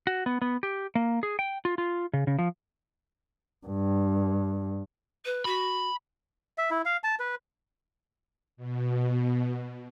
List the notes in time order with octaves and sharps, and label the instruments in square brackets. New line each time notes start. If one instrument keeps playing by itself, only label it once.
[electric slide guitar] F#4
B3
B3
G4
A#3
G#4
G5
F4
F4
C#3
C#3
F3
[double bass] G2
[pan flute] B4
[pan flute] F#4 [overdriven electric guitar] B5
[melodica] E5
E4
F5
A5
B4
[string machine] B2